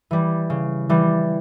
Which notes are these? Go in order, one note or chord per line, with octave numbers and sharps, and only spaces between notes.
E3 G3
C#3
E3 G3